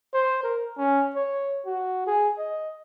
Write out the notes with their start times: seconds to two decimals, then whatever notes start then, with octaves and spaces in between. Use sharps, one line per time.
0.14 C5
0.43 A#4
0.77 C#4
1.16 C#5
1.66 F#4
2.07 G#4
2.38 D#5